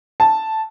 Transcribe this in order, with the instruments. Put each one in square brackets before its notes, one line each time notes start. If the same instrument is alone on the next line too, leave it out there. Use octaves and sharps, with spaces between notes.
[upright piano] A5